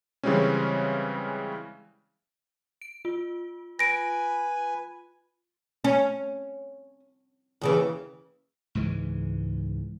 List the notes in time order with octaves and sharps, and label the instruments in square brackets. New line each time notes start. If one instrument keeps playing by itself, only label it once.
[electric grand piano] C#3 E3 G3 G#3 C4 C#4
[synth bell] D7
F4
[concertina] B4 G#5 [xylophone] A#6 D7
[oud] C#4
D#2 C#3 E3
[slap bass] C#2 G#2 E3 G#3